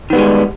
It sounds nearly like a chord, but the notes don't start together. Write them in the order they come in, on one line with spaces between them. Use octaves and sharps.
D#3 B3 G3 G#3